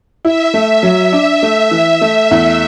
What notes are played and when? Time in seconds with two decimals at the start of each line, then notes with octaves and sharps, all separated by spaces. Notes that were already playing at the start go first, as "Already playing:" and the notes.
0.24 E4 E5
0.54 A3
0.83 F#3
1.12 D4 E5
1.43 A3
1.71 E3
2.01 A3
2.31 E2